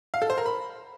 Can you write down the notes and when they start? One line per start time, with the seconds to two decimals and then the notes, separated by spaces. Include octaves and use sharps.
0.14 F5
0.22 A4
0.30 C5
0.38 A#4
0.46 B5